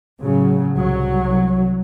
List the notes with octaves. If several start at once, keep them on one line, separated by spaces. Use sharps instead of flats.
A2 C#3 F#3
C2 F#3